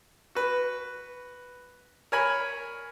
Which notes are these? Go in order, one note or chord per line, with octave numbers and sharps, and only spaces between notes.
F#4 B4
A#4 C#5 G#5 B5